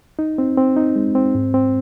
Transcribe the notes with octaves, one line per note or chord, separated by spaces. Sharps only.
D#4
C4
C4
D#4
G#3
C4
G#2
C4